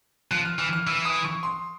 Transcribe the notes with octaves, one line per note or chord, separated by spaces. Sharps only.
F3 F#6
F6
E3 F6
F6
E3 E6
D#6
C#6
C6